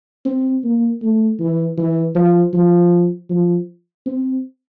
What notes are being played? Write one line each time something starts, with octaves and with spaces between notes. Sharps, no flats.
C4
A#3
A3
E3
E3
F3
F3
F3
C4